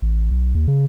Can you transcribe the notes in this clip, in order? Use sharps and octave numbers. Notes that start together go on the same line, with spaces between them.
A1
B1
D#2
C#3